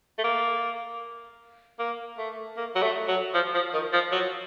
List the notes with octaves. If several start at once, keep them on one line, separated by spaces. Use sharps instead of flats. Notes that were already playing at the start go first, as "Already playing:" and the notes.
A3
A#3
A#3
A3
A#3
F#3
A3
F#3
F3
F3
D#3
F3
F#3